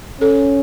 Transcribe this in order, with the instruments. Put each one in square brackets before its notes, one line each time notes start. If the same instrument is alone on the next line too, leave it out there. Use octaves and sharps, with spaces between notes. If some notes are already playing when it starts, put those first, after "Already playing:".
[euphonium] C#4 [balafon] A4